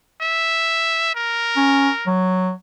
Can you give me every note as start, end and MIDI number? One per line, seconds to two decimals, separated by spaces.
0.21 1.11 76
1.15 2.08 70
1.56 1.89 61
2.07 2.50 54